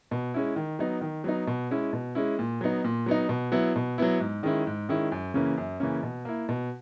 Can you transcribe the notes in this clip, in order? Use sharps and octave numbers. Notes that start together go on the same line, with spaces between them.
B2
G#3 C#4 E4
D#3
F#3 B3 D#4
D#3
F#3 B3 D#4
B2
G#3 C#4 E4
B2
G#3 C#4 E4
A#2
F#3 B3 D#4
A#2
F#3 B3 D#4
B2
F#3 B3 E4
B2
F#3 B3 E4
G#2
D#3 G#3 C#4 E4
G#2
D#3 G#3 C#4 E4
F#2
C#3 E3 A#3 C#4
F#2
C#3 E3 A#3 C#4
B2
A#3 E4
B2